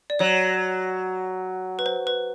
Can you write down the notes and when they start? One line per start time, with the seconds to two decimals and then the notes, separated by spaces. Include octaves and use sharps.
0.10 D5
0.19 F#3 C#5
1.79 B4
1.86 C5
2.07 B4